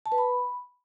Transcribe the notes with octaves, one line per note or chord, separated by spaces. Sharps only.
A5
B4
B5